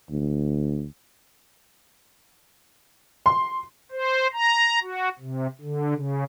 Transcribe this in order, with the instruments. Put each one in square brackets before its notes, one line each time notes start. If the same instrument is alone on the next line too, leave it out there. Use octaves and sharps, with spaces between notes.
[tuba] D2
[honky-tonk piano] C6
[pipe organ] C5
A#5
F#4
C3
D3
C#3